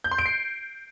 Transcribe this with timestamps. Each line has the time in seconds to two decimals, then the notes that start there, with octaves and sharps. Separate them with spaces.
0.04 G6
0.11 C6
0.19 D7
0.26 C7